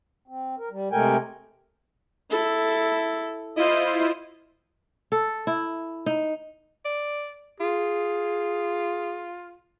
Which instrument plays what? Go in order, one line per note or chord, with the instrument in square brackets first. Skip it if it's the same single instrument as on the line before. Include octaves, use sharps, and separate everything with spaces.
[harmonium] C4
A#4
G3
C3 G#3 A3 A#4 G5 G#5
[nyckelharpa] E4 A4
[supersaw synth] E4 F4 C5 [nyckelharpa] D#5
[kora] A4
E4
D#4
[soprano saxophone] D5
[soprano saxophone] F4 [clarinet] G#4